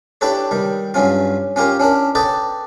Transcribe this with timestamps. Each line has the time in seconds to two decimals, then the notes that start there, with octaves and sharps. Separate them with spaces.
0.21 D4 E4 G4 A4 B4 C#5
0.51 D#3 G3
0.94 G2 F#3 C#4 F4
1.56 C#4 F4 G4 A#4 C#5
1.80 C#4 D4 E4 A#4
2.15 A4 B4 D5 D#5 G5